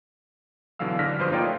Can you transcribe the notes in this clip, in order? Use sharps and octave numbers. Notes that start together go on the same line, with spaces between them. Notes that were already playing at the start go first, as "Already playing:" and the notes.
B2 D3 E3 F#3 F5 E6
G#2 D3 D4 F6 A#6 B6
G2 F3 B4 C5 C6 D#6
A#3 D#4 F4 C#5 D5 G5
A3